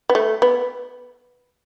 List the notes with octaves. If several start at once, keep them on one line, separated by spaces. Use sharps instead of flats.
B3
A3
B3